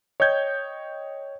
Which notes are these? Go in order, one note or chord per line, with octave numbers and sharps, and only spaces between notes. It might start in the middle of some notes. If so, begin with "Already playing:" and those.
C#5 D#5 G5 G6 G#6